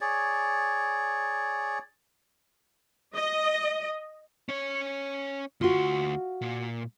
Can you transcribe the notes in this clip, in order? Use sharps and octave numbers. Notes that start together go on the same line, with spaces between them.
G#4 C#5 D5
D#5
C#4 C#5
D2 F4 F#4 C6
A#2